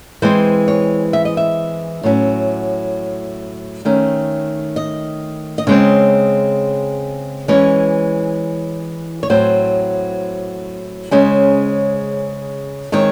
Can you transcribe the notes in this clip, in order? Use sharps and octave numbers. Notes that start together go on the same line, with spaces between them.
E3 G#3 C4 C5
C#5
E5
D#5
E5
A2 F#3 C#4
D#3 A3 C#4
D#5
D#5
C#3 G#3 C4 C#5
E3 G#3 C#4 C#5
C#5
A2 F#3 C4 C5
C#3 G#3 C#4 C5
D#3 G#3 C4 C#5